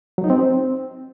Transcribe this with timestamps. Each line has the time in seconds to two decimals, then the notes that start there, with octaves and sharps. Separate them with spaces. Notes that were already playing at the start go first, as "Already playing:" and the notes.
0.18 F#3
0.24 D#4
0.30 C4